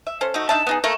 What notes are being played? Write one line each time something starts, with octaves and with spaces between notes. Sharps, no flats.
E5
C#4 A4 C5
A3 D#4 F#4
D4 D#4 E5 A5
B3 D#4 G#4
A3 A#3 A4 A#4